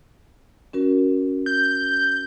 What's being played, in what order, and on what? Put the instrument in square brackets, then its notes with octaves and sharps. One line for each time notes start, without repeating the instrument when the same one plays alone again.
[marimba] C#4 F#4 A#4
[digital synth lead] G6